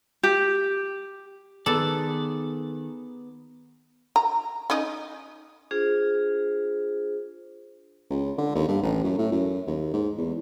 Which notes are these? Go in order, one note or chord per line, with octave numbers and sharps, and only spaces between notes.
G4
D#3 B3 G#4 A4 D5
A#5
C#4 D#4 D#5
D4 F4 G#4 C5
C#2
D3
D#2
G2
A1
F#2
A2
F#2
D#2
G#2
E2